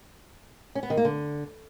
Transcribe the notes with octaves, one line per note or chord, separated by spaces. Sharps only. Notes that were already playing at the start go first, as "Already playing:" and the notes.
C#4
B3
D#3
A#3
D3